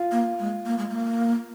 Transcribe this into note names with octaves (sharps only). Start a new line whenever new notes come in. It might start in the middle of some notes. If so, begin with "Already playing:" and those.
Already playing: F4
A#3
G#3
A#3
G#3
A#3